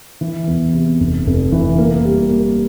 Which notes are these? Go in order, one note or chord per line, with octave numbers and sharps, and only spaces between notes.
E3
E2
C3
F1
F1
E3
A#3
G3
A#3